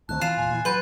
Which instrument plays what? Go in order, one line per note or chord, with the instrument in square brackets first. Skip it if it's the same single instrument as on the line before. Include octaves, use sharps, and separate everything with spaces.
[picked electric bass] D2 D#3 C4 [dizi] A5 [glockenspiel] F#6
[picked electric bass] E3 [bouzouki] F4 [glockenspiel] A6 C7 E7
[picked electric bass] E1 A#2 [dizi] G#5
[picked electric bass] A#2 E3
[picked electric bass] F#3 [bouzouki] F#4 B4 [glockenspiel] C6 G6 A6